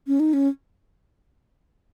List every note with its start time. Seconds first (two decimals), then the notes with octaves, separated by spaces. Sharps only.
0.07 C#4
0.20 D#4
0.33 C#4